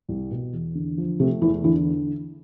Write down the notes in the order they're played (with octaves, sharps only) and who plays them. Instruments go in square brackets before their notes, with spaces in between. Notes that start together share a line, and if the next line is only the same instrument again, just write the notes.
[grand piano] C2
B2
E2
D3
F3
[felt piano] C3 [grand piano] A3
[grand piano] E2 [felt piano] E3
[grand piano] D3 [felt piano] E3